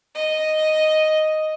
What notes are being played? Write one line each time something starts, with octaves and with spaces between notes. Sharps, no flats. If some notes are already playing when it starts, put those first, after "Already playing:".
D#5